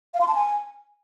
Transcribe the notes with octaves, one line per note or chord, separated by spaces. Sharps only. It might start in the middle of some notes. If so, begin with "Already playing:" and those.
F5
C6
A5
G#5